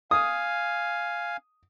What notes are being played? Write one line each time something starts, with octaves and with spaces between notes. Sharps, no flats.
F5 G#5 D#6